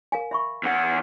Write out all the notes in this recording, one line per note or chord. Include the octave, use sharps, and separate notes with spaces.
A#4 F5 G#5
E5 B5 C#6
E2 F#5